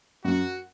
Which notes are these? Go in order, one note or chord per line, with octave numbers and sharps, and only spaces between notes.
F#2 F#4